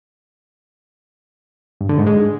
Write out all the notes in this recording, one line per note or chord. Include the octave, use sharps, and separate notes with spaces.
G2
D3
G#2
G#3